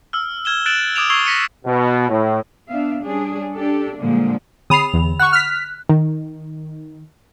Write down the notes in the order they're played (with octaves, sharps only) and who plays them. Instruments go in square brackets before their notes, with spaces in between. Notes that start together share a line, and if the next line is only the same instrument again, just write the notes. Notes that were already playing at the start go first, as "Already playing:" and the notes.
[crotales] E6 F6
F6 G#6 E7 G7
F#6 A6 D7 E7 F#7
D6 D#6 G#6 D7 E7 F7
C#6 E6 G#6 C7 F7 G7
A#6 B6 C#7 D#7
[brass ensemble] B2
A2
[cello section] B3 D4 E5 F5
G3 C#4 D4 G#4
D4 G4 A4
A#2 D3 F3 G3 G#3 A#3
[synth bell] D3 B5 F7 [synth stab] D#6 C7
[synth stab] E2
[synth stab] F#5 C#6 [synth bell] F#6
[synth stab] F6 B6
D#3